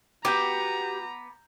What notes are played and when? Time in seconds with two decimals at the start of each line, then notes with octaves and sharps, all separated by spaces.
0.25 B3 F#4 G4 A#5 D6 G6